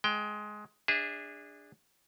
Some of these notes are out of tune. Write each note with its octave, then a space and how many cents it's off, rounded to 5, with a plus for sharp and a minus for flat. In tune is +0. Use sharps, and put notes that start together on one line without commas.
G#3 +15 G5 +0
D4 +0 G#4 -25 E5 -25